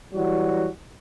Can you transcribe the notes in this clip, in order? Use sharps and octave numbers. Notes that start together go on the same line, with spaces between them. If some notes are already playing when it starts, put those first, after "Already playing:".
E3 F#3 G3 F#4